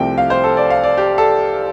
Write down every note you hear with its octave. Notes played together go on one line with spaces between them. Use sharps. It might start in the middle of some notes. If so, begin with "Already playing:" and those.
Already playing: C2 C3 F3 A3 G5
F5
C5
A4
D5
F5
D5
G4
A4